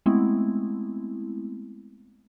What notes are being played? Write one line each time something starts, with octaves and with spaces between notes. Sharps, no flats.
G#3 A3 B3 C4 E4